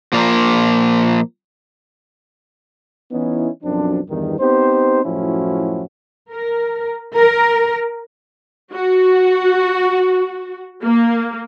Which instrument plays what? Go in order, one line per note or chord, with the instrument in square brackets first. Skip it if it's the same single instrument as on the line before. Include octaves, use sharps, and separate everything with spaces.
[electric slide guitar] A#2 F3 A#3
[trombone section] E3 B3 C#4 D#4 E4
B1 F#2 F3 C4 D4
E2 G2 D#3
B3 C4 D#4 G4 C5
F#2 A2 F3 C#4 E4 F#4
[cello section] A#4
A#4
[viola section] F#4
A#3